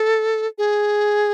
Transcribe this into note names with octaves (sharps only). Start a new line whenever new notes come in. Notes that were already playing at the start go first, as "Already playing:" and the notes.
Already playing: A4
G#4